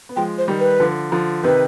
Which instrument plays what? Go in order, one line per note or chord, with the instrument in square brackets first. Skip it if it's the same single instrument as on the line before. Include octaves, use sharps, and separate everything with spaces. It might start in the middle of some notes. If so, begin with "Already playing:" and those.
[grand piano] B3
[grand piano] F3 G#3 [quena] G5
[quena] C5
[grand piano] D#3 G3
[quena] B4
[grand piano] D3 F3
D3 F3
[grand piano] C3 D#3 [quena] B4